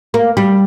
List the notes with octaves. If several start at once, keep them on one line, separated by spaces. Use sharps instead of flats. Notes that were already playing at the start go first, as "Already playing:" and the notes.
A#3
G3